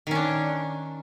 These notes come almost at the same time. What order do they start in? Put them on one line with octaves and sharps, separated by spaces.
D#3 C#4 D4